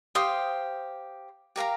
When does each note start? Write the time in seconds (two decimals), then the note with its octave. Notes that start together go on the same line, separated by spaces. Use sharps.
0.15 G4 C5 F5 D#6
1.56 G4 A#4 F5 A#5